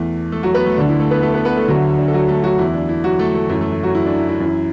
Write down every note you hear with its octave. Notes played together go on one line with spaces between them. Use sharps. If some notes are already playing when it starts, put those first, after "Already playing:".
Already playing: E2 E3 A3
A3 A4
F#3 F#4
B3 B4
A3 A4
D2 D3 D4
E4
A3 A4
B3 B4
A3 A4
B3 B4
B3 B4
A3 A4
D2 D3 F#3 F#4
D4
A4
F#3 F#4
A3 A4
F#3 F#4
E2 E3 E4
D4
E4
F#3 F#4
A3 A4
A3 A4
F#2 E3 A3 A4
A3 A4
A3 A4
F#3 F#4
E4
D4
E4
E4
F#2 E3